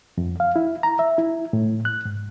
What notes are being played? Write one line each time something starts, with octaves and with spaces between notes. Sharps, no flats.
F2
F5
E4
A#5
E5
E4
A2
F#6
G#2